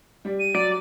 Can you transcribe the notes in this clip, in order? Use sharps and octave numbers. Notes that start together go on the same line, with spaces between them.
G3 D5
D#7
F#3 D5